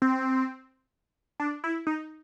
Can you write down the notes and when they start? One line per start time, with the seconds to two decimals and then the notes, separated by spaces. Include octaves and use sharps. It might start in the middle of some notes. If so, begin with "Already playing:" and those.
0.02 C4
1.40 D4
1.64 E4
1.87 D#4